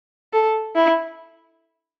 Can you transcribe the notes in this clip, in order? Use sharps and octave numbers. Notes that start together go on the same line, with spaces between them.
A4
E4